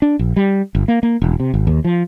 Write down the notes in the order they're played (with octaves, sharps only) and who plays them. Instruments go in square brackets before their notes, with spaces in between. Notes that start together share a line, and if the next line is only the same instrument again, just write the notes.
[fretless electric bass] D4
A#1
G3
G1
A#3
A#3
E1
C3
G#1
D#2
F3